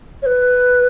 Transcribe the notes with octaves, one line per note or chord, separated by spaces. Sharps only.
C#5
B4